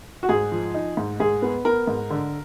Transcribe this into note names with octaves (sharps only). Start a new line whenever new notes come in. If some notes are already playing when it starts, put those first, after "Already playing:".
F#4
G#2 G#4
F3
D#4
G#2
G#2 G#4
B3
B3 A#4
G#2
D3